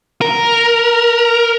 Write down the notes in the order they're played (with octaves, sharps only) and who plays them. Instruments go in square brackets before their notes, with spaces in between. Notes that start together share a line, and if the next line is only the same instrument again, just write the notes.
[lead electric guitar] A#4